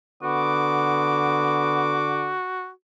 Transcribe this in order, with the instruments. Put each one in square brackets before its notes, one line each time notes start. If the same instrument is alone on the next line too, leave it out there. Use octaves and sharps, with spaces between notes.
[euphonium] D3 [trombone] B3 [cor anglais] F#4 [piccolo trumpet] D6